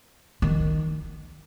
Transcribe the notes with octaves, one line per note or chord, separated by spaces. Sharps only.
D#3